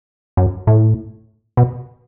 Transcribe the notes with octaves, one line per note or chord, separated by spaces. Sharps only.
F#2
A2
B2